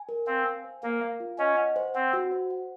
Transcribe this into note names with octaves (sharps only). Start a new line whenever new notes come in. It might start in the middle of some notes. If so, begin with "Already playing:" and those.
Already playing: G#5
A#4
C4 F5
G#5
C5
A#3 A#4
F5
F4
C#4 D#5
F#5
C5
C4 F#5
F#4
C5
F#5